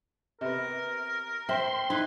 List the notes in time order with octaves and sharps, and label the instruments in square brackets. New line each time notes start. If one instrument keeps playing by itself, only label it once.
[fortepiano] C3 B3 [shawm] A#4
[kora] C4 [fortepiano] E5 [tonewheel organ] C6
[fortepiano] D#4 [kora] E4 [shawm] B4